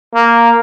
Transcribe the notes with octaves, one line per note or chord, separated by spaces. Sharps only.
A#3